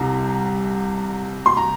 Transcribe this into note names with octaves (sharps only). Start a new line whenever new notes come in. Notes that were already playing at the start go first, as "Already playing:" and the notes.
Already playing: C2 C3 A#5
C6
A#5